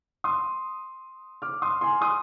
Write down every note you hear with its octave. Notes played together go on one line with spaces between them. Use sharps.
C6 D#6
D6 F6
C6 D#6
G#5 C6
C6 D#6